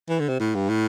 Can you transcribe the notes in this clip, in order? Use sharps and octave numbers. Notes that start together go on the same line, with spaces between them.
E3
D3
C3
A2
G2
A2